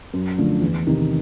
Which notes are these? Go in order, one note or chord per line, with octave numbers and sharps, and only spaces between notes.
F#2
D3 F3 A3
E2
C3 D#3